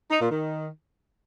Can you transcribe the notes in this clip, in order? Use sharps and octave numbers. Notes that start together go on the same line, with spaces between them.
D#4
A#2
D#3